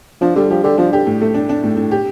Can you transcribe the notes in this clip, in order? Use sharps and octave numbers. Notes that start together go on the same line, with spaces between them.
F3 D4
D3 G3
F3 G4
D3 G4
F3 D4
D3 G4
A2
A3
D4
D4
A2
A2
G4